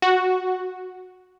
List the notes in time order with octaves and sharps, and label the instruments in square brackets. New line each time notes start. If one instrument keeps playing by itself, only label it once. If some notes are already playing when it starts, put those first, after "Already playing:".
[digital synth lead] F#4